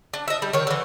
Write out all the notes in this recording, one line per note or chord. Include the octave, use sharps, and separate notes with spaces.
D4
D#5 E5
G3
D#3 C#5
D3 E3